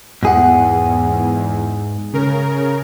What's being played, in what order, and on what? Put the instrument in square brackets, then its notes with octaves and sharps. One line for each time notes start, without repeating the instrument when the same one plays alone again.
[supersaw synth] E2 [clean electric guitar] G#2 G#4 F#5
[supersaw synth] C#3 A#4